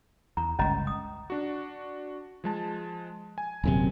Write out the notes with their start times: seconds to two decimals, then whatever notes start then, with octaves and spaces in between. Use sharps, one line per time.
0.37 E2 A#5
0.59 G1 C#2 C#4 D#5 A#5
0.87 D#6
1.30 D4 F#4
2.44 F3 G#3 A5
3.38 G#5
3.64 D#1 F#2 C3